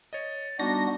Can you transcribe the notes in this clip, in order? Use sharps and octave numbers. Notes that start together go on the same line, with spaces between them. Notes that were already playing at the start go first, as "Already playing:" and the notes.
C#5 D#5 A6
G3 B3 D4 D#4 F#4 A#6